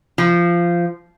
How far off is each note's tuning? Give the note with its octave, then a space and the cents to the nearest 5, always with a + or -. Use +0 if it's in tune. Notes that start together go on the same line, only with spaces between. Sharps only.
F3 -15